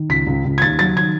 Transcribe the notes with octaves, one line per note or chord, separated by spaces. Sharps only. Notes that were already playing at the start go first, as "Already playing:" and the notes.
Already playing: D#3
C#2 B6
C#2
C#2
G#6
D#2 A6
F#3 A6
D#3 G#6